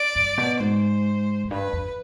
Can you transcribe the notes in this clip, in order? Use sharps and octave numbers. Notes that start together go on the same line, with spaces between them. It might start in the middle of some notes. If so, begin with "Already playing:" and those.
Already playing: D5
G2
B2
G#2 C5
F2
G2 B4
F2